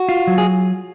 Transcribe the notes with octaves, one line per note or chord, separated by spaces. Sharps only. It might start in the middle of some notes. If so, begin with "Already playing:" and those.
Already playing: F#4
F4
F#3
G#4